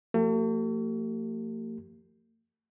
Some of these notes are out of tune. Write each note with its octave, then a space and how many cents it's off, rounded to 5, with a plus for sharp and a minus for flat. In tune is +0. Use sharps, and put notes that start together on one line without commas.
F3 +0 A3 +45 G4 -30